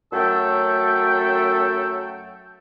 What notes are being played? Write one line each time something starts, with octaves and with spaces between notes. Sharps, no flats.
F#2 F#3 A3 A4 G5